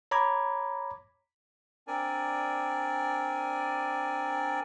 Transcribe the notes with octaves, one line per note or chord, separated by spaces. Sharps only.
C#5 A#5 B5 D6 G#6
C4 D4 A#4 D5 G#5